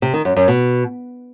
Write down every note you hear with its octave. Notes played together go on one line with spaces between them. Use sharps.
C3
D#3
F#2
F#2
B2